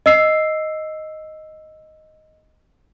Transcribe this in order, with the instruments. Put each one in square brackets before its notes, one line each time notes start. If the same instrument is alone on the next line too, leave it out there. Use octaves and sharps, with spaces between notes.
[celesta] D#5 E6 C7